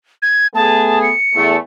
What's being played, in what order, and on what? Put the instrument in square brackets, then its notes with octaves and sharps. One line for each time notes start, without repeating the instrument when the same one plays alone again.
[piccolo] G#6
[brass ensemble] A3 B3 G#4 [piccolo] A5
[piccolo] C#7
[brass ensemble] E2 A3